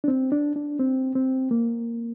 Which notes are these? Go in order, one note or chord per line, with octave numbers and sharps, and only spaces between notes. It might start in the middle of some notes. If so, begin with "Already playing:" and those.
D4
C4
D4
D4
C4
C4
A#3